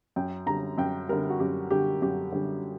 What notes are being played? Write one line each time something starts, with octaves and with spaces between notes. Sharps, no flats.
F#2 G5
D3 G3 A#5
F#2 G5
D3 G3 A#4
F#4
F#2 G4
D3 G3 G4
F#2 G4
D3 G3